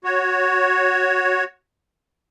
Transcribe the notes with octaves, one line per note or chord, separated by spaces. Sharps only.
F#4 C#5